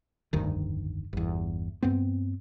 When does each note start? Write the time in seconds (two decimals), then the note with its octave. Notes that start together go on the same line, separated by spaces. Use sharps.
0.33 F1 D2 G2 D#3
1.13 G1 E2
1.83 G2 B3 C4